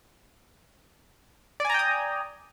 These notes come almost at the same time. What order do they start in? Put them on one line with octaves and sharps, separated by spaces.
D5 G#5 A#5 G5 D#6